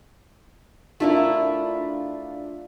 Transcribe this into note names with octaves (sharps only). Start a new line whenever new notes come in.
A3 D4 E4 F4 A#4